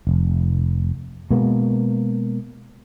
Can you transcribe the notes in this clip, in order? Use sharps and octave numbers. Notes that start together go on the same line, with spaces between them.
F1
B2 G#3 A#3 B3